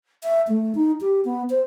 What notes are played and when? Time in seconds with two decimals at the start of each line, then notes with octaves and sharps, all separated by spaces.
0.23 E5
0.47 A3
0.75 D#4
1.01 G4
1.25 B3
1.50 C5